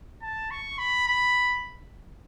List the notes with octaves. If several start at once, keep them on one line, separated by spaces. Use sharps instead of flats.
A5
C#6
B5
B5